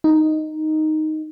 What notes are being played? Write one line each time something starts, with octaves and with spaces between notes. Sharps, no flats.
D#4